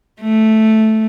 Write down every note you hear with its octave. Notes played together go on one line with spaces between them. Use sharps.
A3